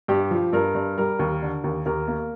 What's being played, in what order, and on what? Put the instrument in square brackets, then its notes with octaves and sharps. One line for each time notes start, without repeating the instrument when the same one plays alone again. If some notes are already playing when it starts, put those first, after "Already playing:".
[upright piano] G2 G4
F3
G2 A#4
G2
G3 A#4
D#2
D3
D#2
D#2 A#4
A#3